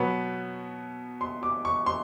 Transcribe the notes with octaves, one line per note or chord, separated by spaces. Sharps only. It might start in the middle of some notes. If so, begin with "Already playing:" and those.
Already playing: B2 F#3 B3 B5
C6
D6
C#6
C6